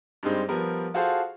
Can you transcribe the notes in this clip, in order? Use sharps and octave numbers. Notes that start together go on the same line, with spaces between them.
G2 G3 G#3 C4 D#4
F3 G3 B3 A#4
F4 F#4 G#4 A4 C5 F5